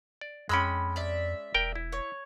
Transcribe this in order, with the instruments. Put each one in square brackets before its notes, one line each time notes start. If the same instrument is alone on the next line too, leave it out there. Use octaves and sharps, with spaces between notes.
[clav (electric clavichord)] D5
[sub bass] F2 [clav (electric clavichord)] G#3 C#4 [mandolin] G5 B5 E6
[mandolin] D5 E5
[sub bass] E1 [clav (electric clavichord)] A#4 G5
[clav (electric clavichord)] E4
[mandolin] C#5